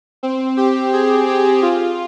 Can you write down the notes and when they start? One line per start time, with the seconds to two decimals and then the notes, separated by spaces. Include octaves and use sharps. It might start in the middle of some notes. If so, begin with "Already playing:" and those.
0.23 C4
0.57 G4
0.93 G#4
1.28 G4
1.62 F4